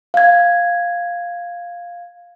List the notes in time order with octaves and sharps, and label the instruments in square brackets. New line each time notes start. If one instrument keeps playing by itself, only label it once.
[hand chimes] F5 G#6